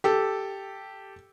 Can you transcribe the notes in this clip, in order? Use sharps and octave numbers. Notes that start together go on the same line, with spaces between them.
G4 A4